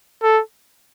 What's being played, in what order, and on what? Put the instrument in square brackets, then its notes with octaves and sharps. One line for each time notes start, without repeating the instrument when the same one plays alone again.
[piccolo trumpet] A4